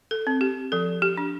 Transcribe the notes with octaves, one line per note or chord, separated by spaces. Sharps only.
A4
C4
G4
F3 A4
G4
D4